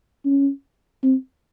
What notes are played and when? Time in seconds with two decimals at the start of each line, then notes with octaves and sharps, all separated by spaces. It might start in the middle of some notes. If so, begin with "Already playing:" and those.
0.25 C#4
1.03 C4